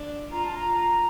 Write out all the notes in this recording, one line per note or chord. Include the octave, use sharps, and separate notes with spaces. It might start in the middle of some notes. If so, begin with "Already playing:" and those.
Already playing: D4
F4 A#5
A5
A#5